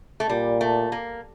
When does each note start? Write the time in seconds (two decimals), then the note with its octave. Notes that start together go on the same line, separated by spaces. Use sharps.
0.20 A3
0.29 A#2 G3
0.61 A3
0.92 A#3